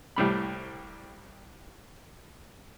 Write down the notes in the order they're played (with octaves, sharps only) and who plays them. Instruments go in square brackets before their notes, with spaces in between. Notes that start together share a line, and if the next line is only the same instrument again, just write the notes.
[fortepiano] C2 A2 G3 B5